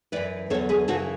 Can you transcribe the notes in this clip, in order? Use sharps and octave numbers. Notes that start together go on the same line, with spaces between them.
F#2 E3 B4 D5
E2 D3 F#3 A4 C#5
G#4 B4
F#2 C#3 E3 F#4 A4